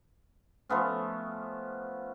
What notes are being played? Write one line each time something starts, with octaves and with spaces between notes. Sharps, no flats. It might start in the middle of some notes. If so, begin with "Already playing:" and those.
F3 A3 B3 C#4